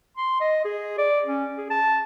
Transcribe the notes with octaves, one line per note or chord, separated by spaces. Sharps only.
C6
D#5
G#4
D5
C#4
G#4
A5